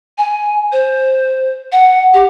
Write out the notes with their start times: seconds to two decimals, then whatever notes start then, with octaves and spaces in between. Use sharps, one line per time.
0.18 G#5
0.72 C5
1.72 F#5
2.14 G4